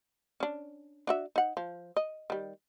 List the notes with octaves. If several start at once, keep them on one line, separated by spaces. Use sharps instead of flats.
C#4 D4
D4 F#4 E5
D#4 F#5
F3
D#5
D#3 G3